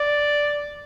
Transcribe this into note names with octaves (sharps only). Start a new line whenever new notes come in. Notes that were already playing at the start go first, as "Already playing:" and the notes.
Already playing: D5